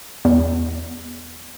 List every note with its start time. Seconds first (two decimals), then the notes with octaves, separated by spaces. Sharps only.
0.25 E2